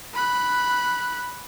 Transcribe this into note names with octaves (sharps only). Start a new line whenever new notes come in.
B5 F#6